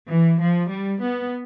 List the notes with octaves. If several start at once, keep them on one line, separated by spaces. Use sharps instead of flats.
E3
F3
G3
B3